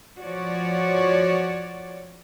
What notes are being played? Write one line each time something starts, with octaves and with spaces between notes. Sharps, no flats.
F3 F#4 C#5 D5